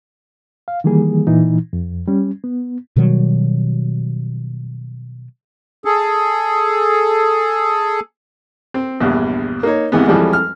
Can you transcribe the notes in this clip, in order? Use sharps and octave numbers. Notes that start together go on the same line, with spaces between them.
F5
D#3 E3 G3 A#3 G#4
A#2 E3 D#4
F2
G3 C#4
B3
B2 D#3 F#3 G3
G#4 A4
C4
A#1 E2 G2
A#3 D#4 C#5
C2 C3 E3 G#3 B3
F2 E3 F3 G3 G#3
F6